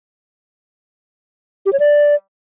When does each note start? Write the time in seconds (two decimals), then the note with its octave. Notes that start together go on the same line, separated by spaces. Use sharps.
1.66 G4
1.73 C#5
1.80 D5